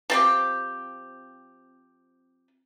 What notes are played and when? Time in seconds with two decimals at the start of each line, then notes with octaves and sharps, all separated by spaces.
0.10 F3 C4 G4